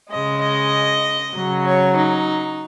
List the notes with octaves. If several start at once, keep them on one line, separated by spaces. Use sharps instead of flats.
C#3 G#3 D#5
D#5
C#3 F#3
C#5
D#4